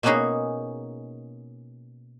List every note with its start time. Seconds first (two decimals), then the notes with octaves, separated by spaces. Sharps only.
0.03 B2 A#3 B3 C#4 D#4 G#4